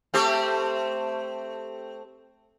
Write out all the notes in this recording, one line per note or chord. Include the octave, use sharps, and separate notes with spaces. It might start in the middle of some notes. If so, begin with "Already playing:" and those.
A3 C4 G4